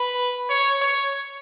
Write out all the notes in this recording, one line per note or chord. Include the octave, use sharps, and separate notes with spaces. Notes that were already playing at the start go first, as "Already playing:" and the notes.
Already playing: B4
C#5
C#5